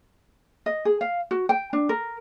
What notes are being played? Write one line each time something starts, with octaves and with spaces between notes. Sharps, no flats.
D#5
G#4
F5
F#4
G5
D4
A#4